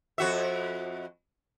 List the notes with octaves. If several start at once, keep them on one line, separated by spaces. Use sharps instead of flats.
F2 F#4 E5